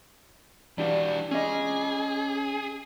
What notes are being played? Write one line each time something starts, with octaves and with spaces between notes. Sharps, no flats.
E3 D4 F#4 G4
C#4 G#4 D#5